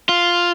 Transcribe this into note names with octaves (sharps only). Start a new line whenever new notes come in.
F4